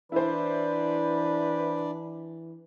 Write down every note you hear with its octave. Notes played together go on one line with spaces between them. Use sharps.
E3 D4 E4 B4 C5 D5